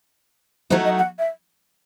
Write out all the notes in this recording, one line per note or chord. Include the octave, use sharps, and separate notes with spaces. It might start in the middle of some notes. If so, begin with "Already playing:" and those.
F#3 A3 D#4 F#4 C5
D#5
F#5
E5